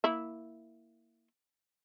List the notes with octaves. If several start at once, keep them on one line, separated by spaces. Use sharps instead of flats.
A#3 E4 E5